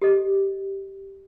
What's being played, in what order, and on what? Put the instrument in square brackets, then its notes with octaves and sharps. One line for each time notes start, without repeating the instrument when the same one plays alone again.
[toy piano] G4 A4 D#5